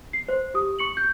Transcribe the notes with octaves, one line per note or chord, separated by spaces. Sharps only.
C7
C5
G4 D#6
C#6 C#7 F#7
G6